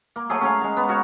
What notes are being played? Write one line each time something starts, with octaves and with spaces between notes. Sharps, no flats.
A#3
F#3 A3 G#4
C#4 G#4 F5
G#3 A#5
B3
F#4 A#4 C#5